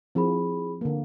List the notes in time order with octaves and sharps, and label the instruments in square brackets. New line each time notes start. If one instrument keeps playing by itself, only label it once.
[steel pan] F3 C4 [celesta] E4 G#4 B5
[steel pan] D3 A#3